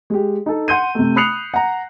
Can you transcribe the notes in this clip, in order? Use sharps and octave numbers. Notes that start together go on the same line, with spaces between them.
G#3 G4
D#4 A4
F#5 C6 G6 D#7
C3 A3
B5 D#6 F#6 C7 C#7 F7
F#5 A#5